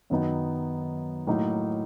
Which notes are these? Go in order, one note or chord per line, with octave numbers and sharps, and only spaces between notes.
F#2 D#3 F#3 B3 D#4
A2 F#3 A#3 D#4